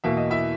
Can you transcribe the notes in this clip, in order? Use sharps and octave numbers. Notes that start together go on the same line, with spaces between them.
E2 B2 A#3 E5
D#5
E4 E5